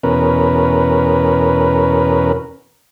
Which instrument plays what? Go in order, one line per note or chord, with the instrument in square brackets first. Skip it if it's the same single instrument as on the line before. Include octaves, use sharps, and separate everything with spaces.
[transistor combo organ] E2 B2 C#4 A#4 B4